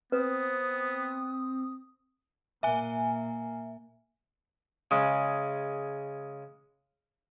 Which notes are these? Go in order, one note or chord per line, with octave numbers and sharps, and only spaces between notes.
B3 C4 B4 D#6
A#2 A#3 E5 G#5
C#3 G#3